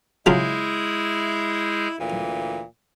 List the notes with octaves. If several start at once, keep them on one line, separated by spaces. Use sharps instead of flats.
C#3 F#3 G#3 E4 F4 G#4 G6
D2 A#2 E3